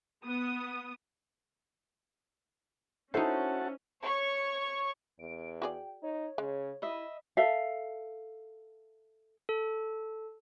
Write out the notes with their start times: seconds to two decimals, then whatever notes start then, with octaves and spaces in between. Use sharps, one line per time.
0.24 B3 D#6
3.14 C#4 D#4 E4 F#4 A4 C5 F#5 A5
4.03 C#5 C#6
5.19 E2 D7
5.62 F#4 G#4 D5 G5
6.03 D#4 C#5
6.38 C#3 G#3
6.82 E4 D#5 E5 B5
7.37 A4 E5 F5
9.49 A4